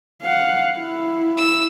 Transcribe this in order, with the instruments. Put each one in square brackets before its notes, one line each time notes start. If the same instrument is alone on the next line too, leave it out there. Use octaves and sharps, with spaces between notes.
[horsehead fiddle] F5 F#5
E4
[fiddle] E6